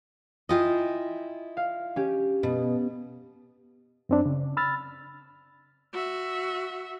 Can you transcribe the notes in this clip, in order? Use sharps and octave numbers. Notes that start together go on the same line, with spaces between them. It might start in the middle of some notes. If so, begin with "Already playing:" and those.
E4 F4 D#5 G5 G#5 D#6
F5
C#4 G4
B2 B3
F#2 C4 D4
C#3
B5 E6 F6 A6
F#4 E5